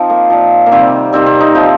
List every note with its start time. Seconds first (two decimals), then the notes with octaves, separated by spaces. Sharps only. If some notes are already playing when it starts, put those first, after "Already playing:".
Already playing: F3 C4 D#4 F4
0.10 A#3
0.30 A#2 F3
0.66 A#3
0.72 C3 D#3 G3 C4
1.13 C3 D#3 G3 C4
1.26 C4
1.41 D#4
1.55 C3 F3 D#4